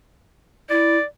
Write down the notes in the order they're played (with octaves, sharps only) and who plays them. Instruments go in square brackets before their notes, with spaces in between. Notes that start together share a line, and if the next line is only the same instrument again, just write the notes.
[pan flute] E4 [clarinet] D5